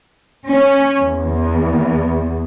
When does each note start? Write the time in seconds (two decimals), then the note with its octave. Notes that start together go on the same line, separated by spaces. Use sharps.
0.48 C#4
1.01 E2